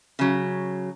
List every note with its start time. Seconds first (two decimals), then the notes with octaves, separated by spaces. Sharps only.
0.19 C#3 F#3